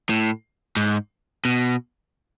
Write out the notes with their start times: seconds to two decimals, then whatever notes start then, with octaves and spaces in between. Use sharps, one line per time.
0.09 A2
0.76 G#2
1.45 B2